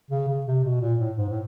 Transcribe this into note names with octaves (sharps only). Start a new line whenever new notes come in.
C#3
C#3
C3
B2
A#2
A2
G#2
A2